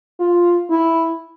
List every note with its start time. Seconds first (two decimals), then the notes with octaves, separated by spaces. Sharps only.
0.20 F4
0.70 E4